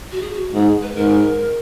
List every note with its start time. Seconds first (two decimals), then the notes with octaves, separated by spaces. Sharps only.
0.12 F#4
0.21 G#4
0.33 F#4
0.54 G#2 G#4
0.82 B4
0.96 G#2 A#4